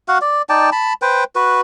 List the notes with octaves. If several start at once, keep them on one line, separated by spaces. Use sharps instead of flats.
F#4 F5 F#5
D5
D#4 D5 G5 A5
A5 B5
B4 C5 G5
F#4 B4